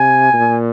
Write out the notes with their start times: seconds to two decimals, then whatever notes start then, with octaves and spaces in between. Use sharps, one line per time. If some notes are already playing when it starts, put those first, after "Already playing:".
Already playing: C3 G#5
0.33 A#2